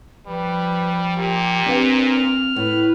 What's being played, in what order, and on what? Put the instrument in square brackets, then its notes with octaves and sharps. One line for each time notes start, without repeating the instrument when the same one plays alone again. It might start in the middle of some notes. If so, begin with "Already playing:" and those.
[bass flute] F3 [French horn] G3 [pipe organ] B4
[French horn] A#2 [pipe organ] G4
[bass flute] C4 [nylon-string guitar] D4 B4 F5
[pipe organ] F6
[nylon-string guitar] A2 [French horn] B4